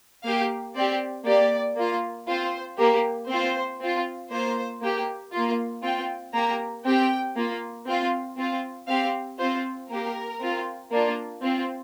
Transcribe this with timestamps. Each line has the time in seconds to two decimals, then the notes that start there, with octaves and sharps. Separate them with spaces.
0.24 A#3 G4 F5
0.75 C4 G4 D5
1.25 A#3 G4 D5
1.77 A#3 F4
2.27 C4 F4 C5
2.78 A#3 G4
3.29 C4 F4 C5
3.80 C4 F4
4.31 A#3 F4 C5
4.81 A#3 G4
5.32 A#3 F4
5.83 C4 F4 G5
6.34 A#3 G4 A#5
6.85 C4 G4 G5
7.36 A#3 F4
7.86 C4 F4
8.37 C4 F4
8.88 C4 G4 F5
9.39 C4 F4 C5
9.90 A#3 G4 A#4
10.40 C4 F4
10.91 A#3 D4 F4
11.42 C4 F4